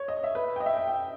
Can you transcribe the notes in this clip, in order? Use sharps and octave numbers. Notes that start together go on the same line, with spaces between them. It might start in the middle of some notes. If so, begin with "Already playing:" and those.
Already playing: C#5
D#5
E5
B4
D#5 G5
E5
G5
G5